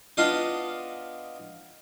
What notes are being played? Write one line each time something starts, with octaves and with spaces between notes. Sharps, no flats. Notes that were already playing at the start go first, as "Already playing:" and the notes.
B3 D4 F4 D#5 F5